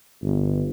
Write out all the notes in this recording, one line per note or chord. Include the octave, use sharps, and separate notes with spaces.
G1